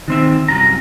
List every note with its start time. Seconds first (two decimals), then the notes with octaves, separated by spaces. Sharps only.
0.08 D#3 C4 E5
0.48 C2 F#2 A#5